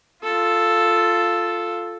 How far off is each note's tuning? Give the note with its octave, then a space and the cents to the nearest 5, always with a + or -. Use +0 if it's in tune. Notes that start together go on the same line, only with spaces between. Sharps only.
F4 +0 A4 +0